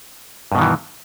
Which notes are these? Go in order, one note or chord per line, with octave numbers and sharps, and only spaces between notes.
G2 B2 D#3 E3